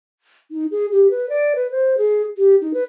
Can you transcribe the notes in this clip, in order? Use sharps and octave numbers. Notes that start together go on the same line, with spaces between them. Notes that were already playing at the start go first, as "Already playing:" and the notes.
D#4
G#4
G4
B4
D5
B4
C5
G#4
G4
D#4
B4